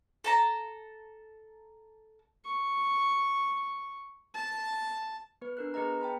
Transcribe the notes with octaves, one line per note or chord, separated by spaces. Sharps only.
A4 A5 A#5
C#6
A5
B3 B4
D4 A#4 F#6
B3 G#4 B4 D#5 A#5
G5 A5 B5